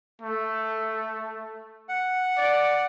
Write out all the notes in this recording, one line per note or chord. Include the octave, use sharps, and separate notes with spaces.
A3
F#5
D5